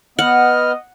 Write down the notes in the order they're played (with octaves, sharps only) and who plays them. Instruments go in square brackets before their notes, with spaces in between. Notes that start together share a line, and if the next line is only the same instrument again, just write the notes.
[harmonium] B3 [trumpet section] D#5 [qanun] F#5 [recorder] F6